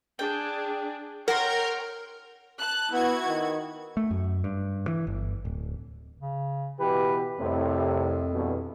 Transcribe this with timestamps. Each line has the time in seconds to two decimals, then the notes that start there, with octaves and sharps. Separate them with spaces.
0.19 D4 G#4 G5
1.28 A#4 C#5 F#5 G5 C6
2.59 A5 F#6
2.92 B3 E4 F#4 G#6
3.27 D#3
3.97 A3
4.11 F#2
4.44 G2
4.88 E3
5.07 G1
5.45 D1
6.20 C#3
6.80 B2 E3 G4 B4
7.39 C2 F2 A2 C3
8.33 E2 G2 B2